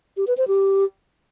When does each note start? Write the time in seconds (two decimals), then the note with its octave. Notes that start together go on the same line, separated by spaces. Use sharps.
0.17 G4
0.27 B4
0.37 C5
0.48 G4